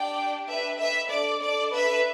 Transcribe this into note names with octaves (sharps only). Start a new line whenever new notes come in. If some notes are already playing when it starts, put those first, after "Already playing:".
Already playing: D4 G4 D5 G5
B4 E5
B4 E5
D4 A4 D5
D5
B4 E5